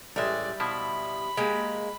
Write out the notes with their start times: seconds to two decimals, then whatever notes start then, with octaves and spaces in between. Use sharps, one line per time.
0.16 A1 G3 G#3 D5 E5
0.60 B2 F3 E4 B5
1.37 G#3 A#3 G4